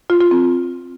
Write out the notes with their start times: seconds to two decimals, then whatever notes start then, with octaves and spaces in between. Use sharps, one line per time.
0.10 F4
0.20 F4
0.31 C4